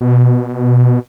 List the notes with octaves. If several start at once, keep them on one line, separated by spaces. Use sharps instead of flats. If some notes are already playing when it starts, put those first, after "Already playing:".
B2